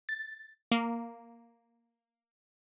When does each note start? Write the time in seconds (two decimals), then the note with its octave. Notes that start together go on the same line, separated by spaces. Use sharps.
0.09 A6
0.72 A#3